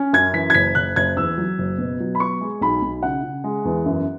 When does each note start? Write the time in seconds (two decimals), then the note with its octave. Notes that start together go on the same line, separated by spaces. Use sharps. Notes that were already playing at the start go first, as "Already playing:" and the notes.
Already playing: C#4
0.13 F#2 G#6
0.33 E3 B6
0.50 G#6
0.54 F#1 B6
0.75 F#1 F#6
0.96 F#1 G#6
1.17 E2 E6
1.38 F#3
1.58 F#1
1.78 B2
2.00 F#3
2.15 B5
2.20 B3 C#6
2.41 G#3
2.61 B1 B5
2.82 B1
3.03 C#3 F#5
3.23 C#3
3.44 G#3
3.65 E2
3.86 F#2